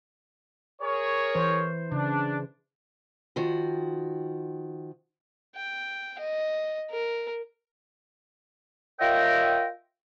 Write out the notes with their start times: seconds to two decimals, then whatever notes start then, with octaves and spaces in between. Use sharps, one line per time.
0.81 G#4 A#4 C#5
1.35 E3 C5
1.92 C#3 D4
3.36 D#3 F3 F#4
5.55 G5
6.19 D#5
6.90 A#4
8.99 F4 A#4 C#5 D#5 E5 G5